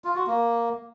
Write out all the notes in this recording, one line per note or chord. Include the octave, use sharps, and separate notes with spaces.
F4
F#4
A#3